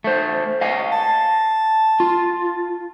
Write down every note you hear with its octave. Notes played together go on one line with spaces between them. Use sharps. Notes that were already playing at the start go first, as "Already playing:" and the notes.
A3 C5
D#5 F5 G#5
A5
F4